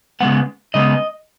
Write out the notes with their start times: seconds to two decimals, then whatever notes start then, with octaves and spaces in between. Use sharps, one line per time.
0.20 C#3 G#3 B3 F#5
0.74 C#3 G#3 B3 D#5